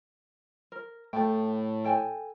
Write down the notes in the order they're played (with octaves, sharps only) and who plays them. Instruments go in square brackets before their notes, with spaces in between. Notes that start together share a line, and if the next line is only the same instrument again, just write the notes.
[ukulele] A#4
[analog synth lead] A2 [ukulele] A4 G5
[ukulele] A4 G5 G#5